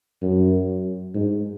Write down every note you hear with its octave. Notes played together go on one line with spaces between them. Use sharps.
F#2
G#2